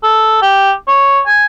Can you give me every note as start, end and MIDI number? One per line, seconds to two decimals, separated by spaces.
0.03 0.41 69
0.42 0.72 67
0.87 1.21 73
1.26 1.46 80